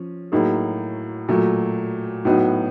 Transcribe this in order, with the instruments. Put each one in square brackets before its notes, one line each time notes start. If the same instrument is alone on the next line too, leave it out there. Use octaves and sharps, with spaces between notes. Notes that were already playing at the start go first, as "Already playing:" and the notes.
Already playing: [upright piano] F3 C#4
A2 F#3 A#3 D#4 G#4
A#2 F#3 A3
A2 F#3 B3 D#4 F#4